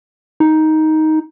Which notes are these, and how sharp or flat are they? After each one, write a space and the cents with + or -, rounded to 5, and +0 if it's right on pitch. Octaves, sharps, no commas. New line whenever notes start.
D#4 +10